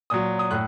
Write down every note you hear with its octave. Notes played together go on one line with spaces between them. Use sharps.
A#2 F#3 D#6
D#6
A2 F#6